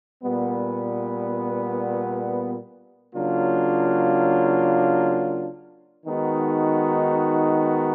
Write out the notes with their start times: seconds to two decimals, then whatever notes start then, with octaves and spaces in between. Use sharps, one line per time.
0.24 A#2 G3 B3
3.15 C#3 F#3 A#3 D4 F4
6.06 D#3 G#3 B3 D#4 F#4